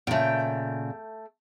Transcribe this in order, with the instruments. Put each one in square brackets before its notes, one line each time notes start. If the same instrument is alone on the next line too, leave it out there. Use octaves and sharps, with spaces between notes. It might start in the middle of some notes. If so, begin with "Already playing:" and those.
[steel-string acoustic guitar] A#2 C#3 [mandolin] A3 G5